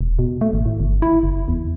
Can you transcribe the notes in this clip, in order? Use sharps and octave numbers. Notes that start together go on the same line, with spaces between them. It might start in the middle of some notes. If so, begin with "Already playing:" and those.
E1
B2
A3
G#1
A2
G1
E4
F#1
E2